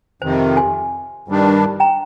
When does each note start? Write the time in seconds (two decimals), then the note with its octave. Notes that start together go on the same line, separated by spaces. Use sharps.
0.22 F2 C3 D#3 C5
0.57 G#5 C6
1.28 G2 D#3 G3 D4
1.80 G5 A#5